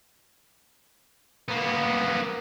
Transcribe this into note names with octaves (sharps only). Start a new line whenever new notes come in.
A#3 B3